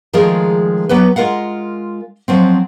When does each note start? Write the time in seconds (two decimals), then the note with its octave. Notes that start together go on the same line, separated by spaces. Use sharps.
0.13 D#3 F3 G#3 A3 G#4 A#4
0.89 F#3 B3 G4 B4
1.16 G#3 F4 A#4 F5 F#5
2.28 F3 F#3 C4